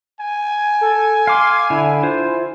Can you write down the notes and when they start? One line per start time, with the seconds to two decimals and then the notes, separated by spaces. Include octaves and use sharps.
0.20 G#5
0.81 A4
1.27 F5 C6 D6
1.70 D3 E4
2.03 F4 C5